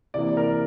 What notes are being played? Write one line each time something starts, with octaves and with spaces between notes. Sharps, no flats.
C3 E3 A#3 D5
A#4